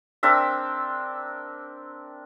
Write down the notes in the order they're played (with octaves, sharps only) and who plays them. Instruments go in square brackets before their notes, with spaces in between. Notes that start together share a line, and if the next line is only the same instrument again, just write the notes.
[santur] C4 D4 A#4 E5